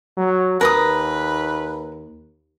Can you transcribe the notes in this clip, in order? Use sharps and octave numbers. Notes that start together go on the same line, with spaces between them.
F#3
D#2 A#4 B4 D6 D#6